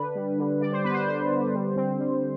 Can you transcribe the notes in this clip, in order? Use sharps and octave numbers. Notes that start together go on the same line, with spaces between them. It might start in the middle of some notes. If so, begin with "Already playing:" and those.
Already playing: D3 D4 B4
G3
D3
G3 D5
C5
B3 B4
C5
D3 C5
D3
G3
C4
G3